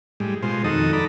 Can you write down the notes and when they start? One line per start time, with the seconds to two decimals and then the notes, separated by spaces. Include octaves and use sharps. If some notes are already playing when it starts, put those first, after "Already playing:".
0.20 A2 G3 G#3
0.43 B2 G#3 F4 C5
0.64 F2 D#3 D#4 F#4 A4 D#6
0.93 A4 D5 A#5 B5